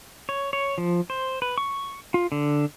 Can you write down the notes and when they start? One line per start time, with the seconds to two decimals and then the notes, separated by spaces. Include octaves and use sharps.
0.29 C#5
0.53 C#5
0.78 F3
1.10 C5
1.42 B4
1.58 C#6
2.14 F4
2.32 D3